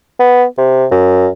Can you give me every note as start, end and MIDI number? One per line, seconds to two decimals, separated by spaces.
0.20 0.45 59
0.58 0.86 48
0.91 1.29 42